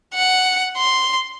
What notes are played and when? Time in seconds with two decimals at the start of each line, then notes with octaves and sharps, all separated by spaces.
0.14 F#5
0.77 C6